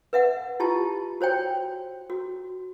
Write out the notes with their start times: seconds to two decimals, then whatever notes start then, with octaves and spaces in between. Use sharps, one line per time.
0.13 B4 E5 F#5
0.60 E4 F4 G4 A5
1.21 F#4 C5 C#5 G5
2.10 F#4